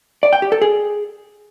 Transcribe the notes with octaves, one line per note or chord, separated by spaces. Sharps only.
D5
G5
G4
A4
G#4